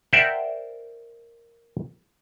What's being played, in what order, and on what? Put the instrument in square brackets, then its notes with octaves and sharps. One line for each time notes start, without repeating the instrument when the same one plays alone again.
[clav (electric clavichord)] A#4 C5 D5 E5 F#5 G5